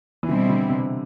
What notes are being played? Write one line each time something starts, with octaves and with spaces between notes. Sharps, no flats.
E3
B2 D3 G3 C4 E4
D3
C3